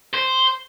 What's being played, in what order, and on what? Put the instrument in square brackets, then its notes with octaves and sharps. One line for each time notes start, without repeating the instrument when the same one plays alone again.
[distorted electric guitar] C5